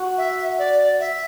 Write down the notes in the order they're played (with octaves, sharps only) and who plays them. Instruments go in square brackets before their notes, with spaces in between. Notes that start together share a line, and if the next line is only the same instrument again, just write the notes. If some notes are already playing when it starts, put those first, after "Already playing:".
Already playing: [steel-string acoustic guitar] F#4
[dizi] E5
D5
E5